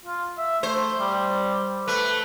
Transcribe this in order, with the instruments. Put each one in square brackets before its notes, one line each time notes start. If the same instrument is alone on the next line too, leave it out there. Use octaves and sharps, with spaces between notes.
[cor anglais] F4
E5
[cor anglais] A3 [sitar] C5
[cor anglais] G3
[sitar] A3 [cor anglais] B4